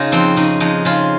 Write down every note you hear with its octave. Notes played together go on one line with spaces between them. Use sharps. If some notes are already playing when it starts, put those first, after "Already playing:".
Already playing: C#3 D#4 F4
F2 C4
C#3 D#4
F2 D#4
C#3 F4